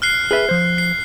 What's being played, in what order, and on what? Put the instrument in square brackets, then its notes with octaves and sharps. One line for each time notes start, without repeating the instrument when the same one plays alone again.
[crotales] F6 F#6 C7
[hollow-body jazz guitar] G#4 B4 E5
F3 C5
[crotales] C7